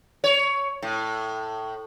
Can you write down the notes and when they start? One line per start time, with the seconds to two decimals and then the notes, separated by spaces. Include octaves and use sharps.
0.24 C#5
0.82 A2